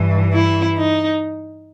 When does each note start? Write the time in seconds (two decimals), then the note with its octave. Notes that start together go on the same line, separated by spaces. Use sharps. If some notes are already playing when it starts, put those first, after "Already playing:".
Already playing: G2 E3
0.32 E4
0.77 D#4